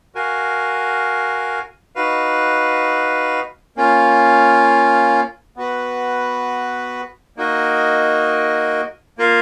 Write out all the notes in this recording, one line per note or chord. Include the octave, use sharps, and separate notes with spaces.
F#4 A#4 F5 G#5
D#4 F#4 B4 F5
A#3 C#4 F4
B3 F#4 B4
A#3 D#4 F#4 A#4 D#5
A#3 F4 A#4 F5